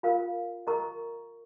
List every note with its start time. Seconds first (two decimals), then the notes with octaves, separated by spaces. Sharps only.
0.03 F4 A#4 F5
0.67 A#4 D#5 A#5 C#6